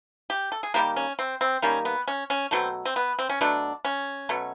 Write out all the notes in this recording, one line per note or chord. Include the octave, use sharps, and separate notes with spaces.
G4
A4
G#4
D#3 G3 A#3 G4
C#4
C4
C4
D#3 G3 A#3 C#4
B3
C#4
C#4
B2 F#3 A3 C4
C4
B3
C4
C#4
B2 F#3 A3 D4
C#4
B2 F#3 A3